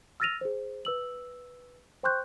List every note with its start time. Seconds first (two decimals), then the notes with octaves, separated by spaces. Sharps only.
0.20 E6 F6 A6 A#6 D#7 F7
0.41 G#4 C5
0.85 B4 E6 F#7
2.03 C5 G5 C6 C#6 F#6 G6